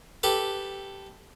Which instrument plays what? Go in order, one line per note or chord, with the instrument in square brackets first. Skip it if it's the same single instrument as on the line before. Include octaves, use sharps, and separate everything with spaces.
[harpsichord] G4 A4 B4